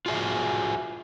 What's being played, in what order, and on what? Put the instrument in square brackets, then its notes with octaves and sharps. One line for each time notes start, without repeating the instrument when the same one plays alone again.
[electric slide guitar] F4 F#4 G#4 C#5 E5